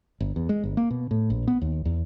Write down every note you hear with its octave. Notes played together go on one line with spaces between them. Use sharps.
G1
E2
G#3
G1
A#3
B2
A2
A#1
B3
D#2
E2